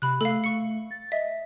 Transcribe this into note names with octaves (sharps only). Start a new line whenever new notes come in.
C3 B5 F#6
A3 A4 F5
C#6 C#7
A6
D#5 E5